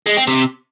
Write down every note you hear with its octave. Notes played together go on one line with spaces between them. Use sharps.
G#3
C4
C3